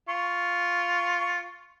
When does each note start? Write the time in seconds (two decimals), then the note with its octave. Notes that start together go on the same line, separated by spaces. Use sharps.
0.09 F4 C#6